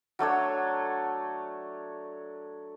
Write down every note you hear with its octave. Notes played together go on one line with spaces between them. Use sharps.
F#3 A3 D4 C#5